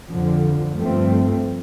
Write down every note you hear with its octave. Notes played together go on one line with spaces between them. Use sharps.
F2 D3 F3
G2 F3 A3 C4